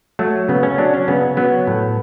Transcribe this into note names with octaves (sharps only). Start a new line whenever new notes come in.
F#3 A3
C#3 B3
C#4
F#3 D4
C#4
C#3 B3
F#3 B3
A2